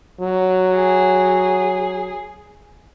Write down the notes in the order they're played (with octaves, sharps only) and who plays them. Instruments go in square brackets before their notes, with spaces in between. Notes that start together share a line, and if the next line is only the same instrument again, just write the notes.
[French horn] F#3
[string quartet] G#4